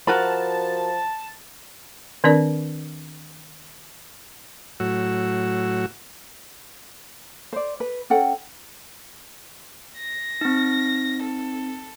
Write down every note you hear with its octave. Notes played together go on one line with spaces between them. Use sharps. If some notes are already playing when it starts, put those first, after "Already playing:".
F3 F#4 A#4 A5 B5
D#3 C4 D4 A#4 D5
A2 F#3 F#4 E6
C5 D5
B4
C#4 A4 F#5 G5
A#6
C4 D#4
A4